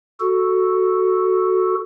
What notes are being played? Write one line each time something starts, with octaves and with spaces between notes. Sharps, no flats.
F#4 A4